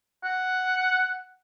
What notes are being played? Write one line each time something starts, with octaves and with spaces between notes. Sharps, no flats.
F#5